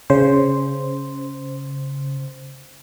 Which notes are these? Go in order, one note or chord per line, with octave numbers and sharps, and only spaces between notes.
C#3 C5